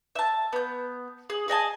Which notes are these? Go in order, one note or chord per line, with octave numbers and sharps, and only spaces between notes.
E5 A5
B3 G6
G#4
G#4 D#5 G#5 A5